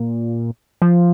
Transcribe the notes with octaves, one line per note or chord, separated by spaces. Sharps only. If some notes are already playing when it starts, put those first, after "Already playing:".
Already playing: A#2
F3